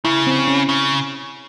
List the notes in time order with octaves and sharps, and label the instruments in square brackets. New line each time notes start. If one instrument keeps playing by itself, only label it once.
[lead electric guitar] C#3 [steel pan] E4
[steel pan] C4
C#4
[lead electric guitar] C#3